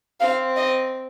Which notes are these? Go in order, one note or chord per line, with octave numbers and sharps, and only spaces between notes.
C4 F5
D#5